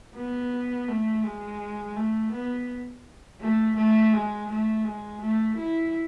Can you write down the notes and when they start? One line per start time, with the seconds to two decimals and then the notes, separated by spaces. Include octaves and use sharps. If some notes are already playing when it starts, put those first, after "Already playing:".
0.15 B3
0.89 A3
1.24 G#3
1.96 A3
2.33 B3
3.41 A3
3.76 A3
4.13 G#3
4.49 A3
4.84 G#3
5.22 A3
5.57 E4